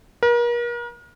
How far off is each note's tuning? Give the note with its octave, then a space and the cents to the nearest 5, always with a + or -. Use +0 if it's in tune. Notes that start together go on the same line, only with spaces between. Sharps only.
A#4 +40